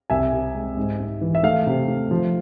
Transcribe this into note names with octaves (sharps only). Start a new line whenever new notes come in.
C2 E5 G#5
C3
G#3
G#2
G#2
E3
E5
A3 F5
C3
A3
F3